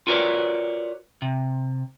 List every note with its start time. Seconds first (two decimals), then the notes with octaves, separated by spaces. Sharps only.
0.07 F4 F#4 A#4 B4 C#5 D5
1.22 C3